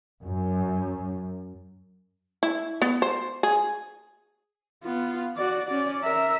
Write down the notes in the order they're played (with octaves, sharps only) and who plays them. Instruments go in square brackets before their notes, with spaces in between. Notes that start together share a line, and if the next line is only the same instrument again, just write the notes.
[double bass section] F#2
[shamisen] E4
B3
C5
G#4
[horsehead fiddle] B3 F4
F#4 D5
C#4 D5
A#4 E5